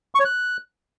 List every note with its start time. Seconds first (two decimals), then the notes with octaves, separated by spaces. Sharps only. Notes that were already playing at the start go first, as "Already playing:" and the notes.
0.15 C#6
0.20 C#5
0.25 F#6